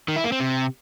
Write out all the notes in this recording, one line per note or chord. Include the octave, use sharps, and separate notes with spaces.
D#3
E4
A#3
C4
C3